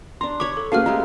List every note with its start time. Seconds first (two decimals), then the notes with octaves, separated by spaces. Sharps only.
0.21 D4 A#5 C6
0.40 C#5 B5 C#6 D6
0.57 A4
0.72 A#3 C#4 F#4 G#4 A4 B4 F5 F6
0.86 G#3 A3 G4 A#5